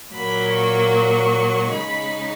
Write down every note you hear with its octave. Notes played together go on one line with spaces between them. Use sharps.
A#2 F#3 A#3 B5
C#6
C#6
C#3 G#3 D#4 B5